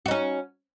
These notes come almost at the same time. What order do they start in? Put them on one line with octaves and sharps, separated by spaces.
F#4 D#4 C#4